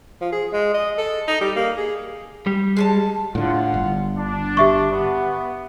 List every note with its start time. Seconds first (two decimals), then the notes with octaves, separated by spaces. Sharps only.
0.21 F3
0.32 G#4
0.53 G#3
0.74 D#5
0.98 A4
1.28 D#4
1.41 G3
1.56 A#3
1.78 G#4
2.47 G3
2.77 G#3 G#5 A5
3.35 A2 D3 F4 F#5
3.74 G1
4.18 D4
4.57 G4 E5 C#6
4.92 B3